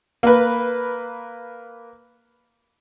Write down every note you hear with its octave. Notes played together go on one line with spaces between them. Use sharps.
A#3 B4